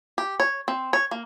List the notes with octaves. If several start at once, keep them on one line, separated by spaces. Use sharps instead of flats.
G4
C#5
C4
C#5
A#3